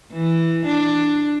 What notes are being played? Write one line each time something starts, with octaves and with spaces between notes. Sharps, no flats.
E3
D4